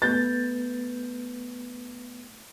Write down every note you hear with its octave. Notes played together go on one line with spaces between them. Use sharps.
A3 B3 B4 G6 A6